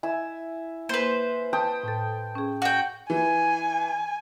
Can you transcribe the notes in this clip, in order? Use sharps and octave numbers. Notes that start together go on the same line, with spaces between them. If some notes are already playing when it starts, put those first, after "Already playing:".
E4 G#5 E6
A#3 B4 C5
G5 A5 D#6
A2 A4
C#4 G#4
F#4 F5 G5
E3 G#5